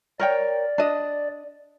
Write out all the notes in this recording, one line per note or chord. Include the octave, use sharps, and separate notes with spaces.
A#4 C#5 D5 G5
D4 D#5